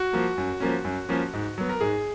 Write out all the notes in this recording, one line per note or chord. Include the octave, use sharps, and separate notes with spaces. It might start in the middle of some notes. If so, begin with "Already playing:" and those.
Already playing: F#4
F3 A#3
F#2
F3 A#3 C#4
F#2
F3 A#3 C#4
G#2
F#3 B3
A#4
G#2 G#4